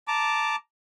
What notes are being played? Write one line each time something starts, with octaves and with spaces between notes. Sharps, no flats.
A5 A#5 D6